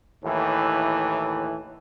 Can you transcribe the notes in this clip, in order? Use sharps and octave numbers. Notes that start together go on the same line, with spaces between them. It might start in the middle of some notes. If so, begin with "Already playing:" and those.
D#2 A2 E3